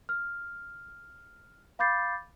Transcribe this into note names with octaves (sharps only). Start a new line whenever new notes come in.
F6
F5 B5 D6 G6 A6 C7